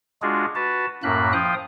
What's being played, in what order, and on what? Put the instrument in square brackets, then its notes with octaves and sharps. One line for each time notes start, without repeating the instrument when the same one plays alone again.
[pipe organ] G#3 D4 F4 F#4 G#4
F#4 B4 A5
F#2 A2 A#3 B5 F#6
F3 F5 G5 D#6